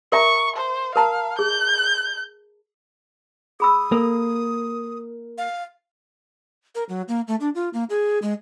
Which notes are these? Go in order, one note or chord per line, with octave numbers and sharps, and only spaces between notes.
A#4 E5 A#5 C#6
C5
A#4 F5 A5 A#5
G#4 G6
G#4 B5 D#6 E6
A#3 A4 A#4
F5
A#4
F#3
A#3
A3
D4
F4
A#3
G#4
G#3